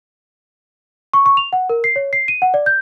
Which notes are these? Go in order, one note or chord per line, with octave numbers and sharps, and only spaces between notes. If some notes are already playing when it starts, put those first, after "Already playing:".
C#6
C#6
F7
F#5
A#4
C7
C#5
C7
D#7
F#5
D5
G6